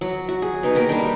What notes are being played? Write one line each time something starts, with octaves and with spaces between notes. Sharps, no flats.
F#3
F#4
G#4
B2 D#4
A#3 G4 A#4
G3 D4